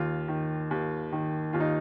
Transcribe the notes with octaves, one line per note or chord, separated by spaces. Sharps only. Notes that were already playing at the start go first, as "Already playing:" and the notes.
Already playing: D#2 F4
D#3
D#2
D#3
D#2 F4
D#4